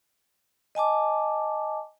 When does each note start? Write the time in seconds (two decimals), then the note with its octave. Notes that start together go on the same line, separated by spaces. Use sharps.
0.75 D#5 G#5 A5 D6